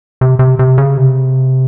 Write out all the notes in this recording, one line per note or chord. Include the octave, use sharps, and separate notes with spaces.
C3
C3
C3
C#3
C3